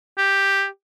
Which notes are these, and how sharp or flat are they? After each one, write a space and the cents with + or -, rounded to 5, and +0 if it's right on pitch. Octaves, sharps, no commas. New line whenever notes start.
G4 +5